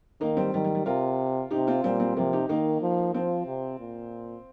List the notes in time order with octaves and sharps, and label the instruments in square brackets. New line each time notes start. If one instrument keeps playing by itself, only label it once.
[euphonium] D#3 [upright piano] A#3 D#4
[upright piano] G3 C4
[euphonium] D#3 [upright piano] G3
[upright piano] G3
G3
[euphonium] C3 [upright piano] F4 A#4
[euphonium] C3 [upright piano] D#4 G4
[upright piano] C4 F4
[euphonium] A#2 [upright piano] G3 C4
[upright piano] G3 C4
[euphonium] C3 [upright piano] F3 A#3
[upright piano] D#4 G4
[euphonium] D#3 [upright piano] A#3 D#4
[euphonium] F3
[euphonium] F3 [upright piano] C4 F4
[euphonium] C3
A#2